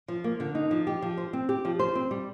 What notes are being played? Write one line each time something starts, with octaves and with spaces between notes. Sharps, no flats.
F3
A#3
D3
D#4
F3
G4
F3
C5
C4
G4
F3
C5
C4
G3